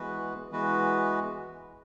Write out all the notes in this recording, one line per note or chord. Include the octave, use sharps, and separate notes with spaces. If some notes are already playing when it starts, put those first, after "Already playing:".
Already playing: E3 G#3 B3 F#4 B4
E3 G#3 B3 F#4 B4